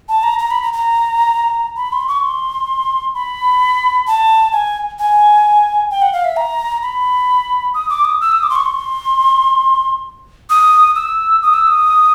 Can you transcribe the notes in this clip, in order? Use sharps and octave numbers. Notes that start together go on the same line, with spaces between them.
A5
A#5
A#5
B5
A#5
A#5
B5
C6
C#6
C6
B5
A5
G#5
G#5
G5
F#5
F5
E5
A#5
B5
D#6
D6
D#6
E6
D#6
D6
C6
C#6
C6
D#6
E6
D#6
E6
D#6